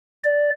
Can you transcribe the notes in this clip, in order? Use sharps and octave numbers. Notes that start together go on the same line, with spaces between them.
D5